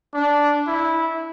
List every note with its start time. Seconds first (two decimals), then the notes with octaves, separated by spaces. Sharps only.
0.14 D4
0.67 E4